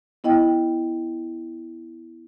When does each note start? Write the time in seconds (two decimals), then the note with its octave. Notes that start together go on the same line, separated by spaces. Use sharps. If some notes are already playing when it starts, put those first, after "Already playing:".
0.24 B3 E4 D#5 G5